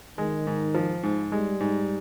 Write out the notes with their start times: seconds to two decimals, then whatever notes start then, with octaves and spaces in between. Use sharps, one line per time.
0.18 D#3 G#3
0.47 G#2
0.75 F3
1.03 G#2
1.32 G3 G#3
1.60 G#2